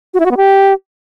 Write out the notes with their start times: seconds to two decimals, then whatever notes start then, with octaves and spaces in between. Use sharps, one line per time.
0.14 F#4
0.20 E4
0.25 F#4
0.31 B3
0.37 G4